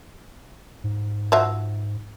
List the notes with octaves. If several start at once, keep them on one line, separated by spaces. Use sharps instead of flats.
G#2
F3 F#4 E5